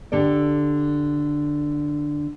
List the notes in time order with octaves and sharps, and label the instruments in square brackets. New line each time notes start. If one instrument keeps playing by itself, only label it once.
[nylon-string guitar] D3 G4 A4 D5